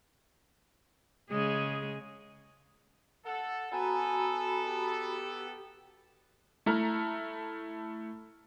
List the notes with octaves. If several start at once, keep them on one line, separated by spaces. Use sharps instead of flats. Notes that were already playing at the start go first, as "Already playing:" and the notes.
C#3 G#3 G#4
A4 F#5
B3 F#4 A4 G#5 A#5 B5
G4
A3 E4 A#5 F6